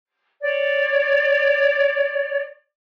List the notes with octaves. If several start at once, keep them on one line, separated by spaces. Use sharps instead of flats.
C#5 D5